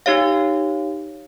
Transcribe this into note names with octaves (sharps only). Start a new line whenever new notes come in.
D#4 G4 C#5 F5